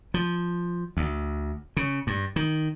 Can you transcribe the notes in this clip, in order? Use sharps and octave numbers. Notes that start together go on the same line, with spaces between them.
F3
D2
C#3
G2
D#3